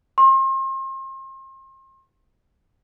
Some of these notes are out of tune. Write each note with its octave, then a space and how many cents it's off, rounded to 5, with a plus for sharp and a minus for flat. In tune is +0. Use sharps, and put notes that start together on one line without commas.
C6 +40